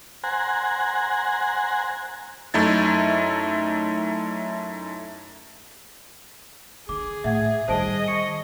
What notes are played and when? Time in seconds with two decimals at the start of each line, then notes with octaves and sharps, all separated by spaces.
0.24 C5 F#5 G#5 A#5
2.54 F#2 A3 D#4 E4 A6
6.89 D3 G#4 D6
7.24 A2 E5 F#5 G#6
7.68 D#3 G3 G#4 C5 D#5 A5 D7
8.08 C#6 C#7